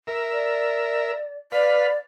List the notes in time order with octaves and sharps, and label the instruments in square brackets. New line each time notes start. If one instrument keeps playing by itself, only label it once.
[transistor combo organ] A#4 E5
[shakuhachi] D5
[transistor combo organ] B4 F5 [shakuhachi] D5